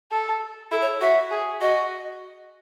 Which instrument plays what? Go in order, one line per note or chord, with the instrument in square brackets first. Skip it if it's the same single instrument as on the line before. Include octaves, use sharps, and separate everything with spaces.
[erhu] A4
[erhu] E4 [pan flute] A4
[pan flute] C#5
[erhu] F#4 [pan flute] E5
[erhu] G#4
[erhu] F#4 [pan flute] D#5